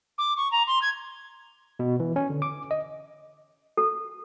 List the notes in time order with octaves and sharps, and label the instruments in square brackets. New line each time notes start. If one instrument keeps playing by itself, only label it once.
[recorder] D6
C#6
A#5
C6
G#6
[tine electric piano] B2
E3
C#4
D3
D6
D#5
[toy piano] A4